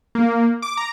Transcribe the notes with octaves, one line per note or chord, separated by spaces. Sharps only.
A#3
D6
A#5